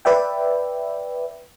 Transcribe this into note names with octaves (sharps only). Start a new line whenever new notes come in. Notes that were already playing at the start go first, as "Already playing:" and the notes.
B4 D5 E5 G5